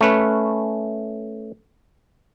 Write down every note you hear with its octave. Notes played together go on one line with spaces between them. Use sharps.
A3 C#4 B4